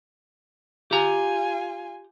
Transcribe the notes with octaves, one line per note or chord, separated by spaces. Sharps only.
F4 G4 G#5 A#5